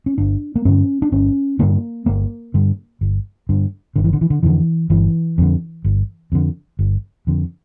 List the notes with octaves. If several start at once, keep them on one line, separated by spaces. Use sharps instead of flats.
C#4
G1 D4
A#3
G2 D3 C#4
D4
G1 C#4
G2 D3 A#3
G1 A#3
G2 D3
G1
G2 D3
G1 D3
E3
D3
E3
D3
F2 D3 E3
G1 E3
F2 D3
G1
F2 D3
G1
F2 D3